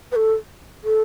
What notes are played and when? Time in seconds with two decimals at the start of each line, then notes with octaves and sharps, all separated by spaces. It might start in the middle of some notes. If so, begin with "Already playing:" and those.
0.12 B4
0.16 A4
0.84 A4